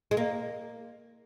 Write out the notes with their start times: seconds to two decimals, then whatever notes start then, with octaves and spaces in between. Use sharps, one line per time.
0.11 G#3
0.17 A#3